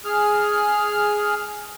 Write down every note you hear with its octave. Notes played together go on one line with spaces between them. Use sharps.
G#4 F6